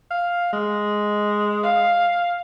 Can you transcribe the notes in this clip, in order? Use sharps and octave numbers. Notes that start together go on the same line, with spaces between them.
F5
G#3
F5